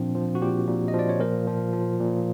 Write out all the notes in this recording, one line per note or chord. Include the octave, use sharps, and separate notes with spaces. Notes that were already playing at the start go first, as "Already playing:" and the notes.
Already playing: A#2 F3 C4 D4
F3
F#4
A#2 F4 G4
A#2
D#5
F3
D5
C#5
A#2 A#4 C5
F3
F3
A#2